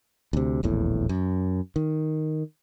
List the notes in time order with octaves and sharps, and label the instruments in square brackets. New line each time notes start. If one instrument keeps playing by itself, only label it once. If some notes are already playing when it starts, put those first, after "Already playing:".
[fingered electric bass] D2 C3
D#1 A#1 E2 A2
F#2
D#3